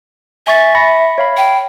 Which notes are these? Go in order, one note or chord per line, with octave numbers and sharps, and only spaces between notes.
E5 G#5 C#6 A6
B5 A#6 C#7
C#5 F5 B5
G5